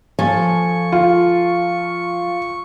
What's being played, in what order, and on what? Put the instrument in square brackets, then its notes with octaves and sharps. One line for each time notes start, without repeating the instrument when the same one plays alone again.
[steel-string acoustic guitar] F3 A4 G#5 [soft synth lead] C#6
[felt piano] F4